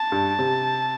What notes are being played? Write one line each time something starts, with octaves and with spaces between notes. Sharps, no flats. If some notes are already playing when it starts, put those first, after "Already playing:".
Already playing: A5
G2
C3